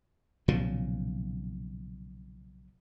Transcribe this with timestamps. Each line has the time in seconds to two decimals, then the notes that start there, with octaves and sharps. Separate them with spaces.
0.48 B1 A#2 C#3 F3